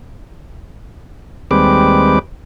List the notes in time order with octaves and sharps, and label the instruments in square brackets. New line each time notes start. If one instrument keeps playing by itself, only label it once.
[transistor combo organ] D#2 G3 G#3 C4 B4 D6